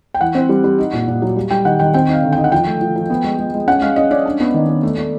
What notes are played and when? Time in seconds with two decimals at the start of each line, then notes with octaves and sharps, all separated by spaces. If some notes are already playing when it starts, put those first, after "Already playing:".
0.14 G5
0.21 E3 F#5
0.35 C4
0.49 G3
0.64 G3
0.78 D#4
0.93 A#2
1.08 A#2
1.22 F#3
1.36 G3
1.51 G3 G5
1.65 D#3 F#5
1.80 D#3 G5
1.94 C4 G5
2.08 D#4
2.13 F5
2.23 D3
2.33 G5
2.38 D#4
2.44 F#5
2.52 F3 G5
2.67 A3
2.81 F3
2.96 F3
3.10 B3
3.24 G#3
3.39 G#3
3.53 G#3
3.67 C#4 F#5
3.82 G#3 F5
3.96 C#4 D#5
4.11 C#4 D5
4.25 D4
4.40 B3
4.54 D#3
4.69 B3
4.83 A3
4.98 A3